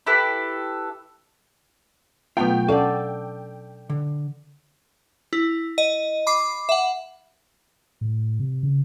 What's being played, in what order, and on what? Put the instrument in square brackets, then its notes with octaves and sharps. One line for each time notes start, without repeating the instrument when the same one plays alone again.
[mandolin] E4 G4 A4 B4
[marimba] B2 F#3 F#5 [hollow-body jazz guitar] A3 B3 F4 [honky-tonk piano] G5
[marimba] C#4 F#5 [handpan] A4 D5 [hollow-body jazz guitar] F5
[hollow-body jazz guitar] D3
[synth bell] E4
D#5
B5 D6 C7
E5 F#5
[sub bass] A2
C3
C#3